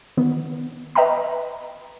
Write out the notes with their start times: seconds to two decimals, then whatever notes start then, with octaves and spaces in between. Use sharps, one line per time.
0.17 D#3 B3
0.95 B4 D#5 E5 G5 A#5 B5